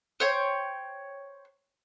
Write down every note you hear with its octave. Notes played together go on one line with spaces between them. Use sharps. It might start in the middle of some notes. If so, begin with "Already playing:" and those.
C5 C#5 G5